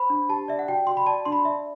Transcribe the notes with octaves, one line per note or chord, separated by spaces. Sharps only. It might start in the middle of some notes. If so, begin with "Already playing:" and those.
Already playing: C5 B5
D4
G4 A5
D5 E5
F#5
F#4 G5
F#4 C6
B5
D5 A5
D4 C6
B5
D5 E5